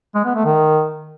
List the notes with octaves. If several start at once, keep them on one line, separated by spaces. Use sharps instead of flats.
G#3
B3
A3
D#3